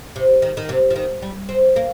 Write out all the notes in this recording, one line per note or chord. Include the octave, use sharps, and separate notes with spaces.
C3
D#3
D#3
C3
F3
D#3
G3
C4
A#3